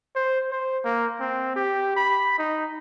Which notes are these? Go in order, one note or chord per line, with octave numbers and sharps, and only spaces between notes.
C5
C5
A#3
C4
G4
B5
D#4